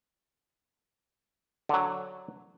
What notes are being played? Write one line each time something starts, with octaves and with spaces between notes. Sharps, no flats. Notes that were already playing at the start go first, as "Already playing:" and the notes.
D3 F#3